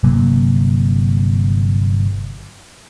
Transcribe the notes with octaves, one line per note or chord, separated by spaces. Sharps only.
G1 C3 F#3 A#3